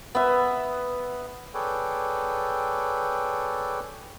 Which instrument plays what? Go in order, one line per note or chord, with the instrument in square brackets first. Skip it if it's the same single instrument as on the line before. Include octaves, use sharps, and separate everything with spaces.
[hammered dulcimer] B3 E5
[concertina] G#4 A4 B4 C#5 D5 G5